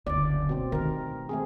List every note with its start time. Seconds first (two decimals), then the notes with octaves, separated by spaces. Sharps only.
0.07 F#1 D2 D5
0.49 B2 C4
0.72 D#3 A3 A#4
1.29 A3 C4 G#4